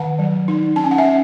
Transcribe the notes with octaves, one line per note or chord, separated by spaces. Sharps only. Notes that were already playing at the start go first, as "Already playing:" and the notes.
Already playing: D#3 F#5 A5
F#3
D#4
C#4 A5
G#5
F#5
E5 G#5
C#4